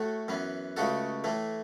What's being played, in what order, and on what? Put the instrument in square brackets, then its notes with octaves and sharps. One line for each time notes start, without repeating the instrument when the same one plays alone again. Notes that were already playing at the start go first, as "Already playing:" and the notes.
Already playing: [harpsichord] A2 A3 F#4 A4
F#2 E3 B3
C#2 C#3 A3 F#4 A4
A2 E3 A3